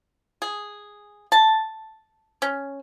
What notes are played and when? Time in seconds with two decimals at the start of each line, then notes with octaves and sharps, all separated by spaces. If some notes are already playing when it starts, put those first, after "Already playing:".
0.42 G#4
1.32 A5
2.42 C#4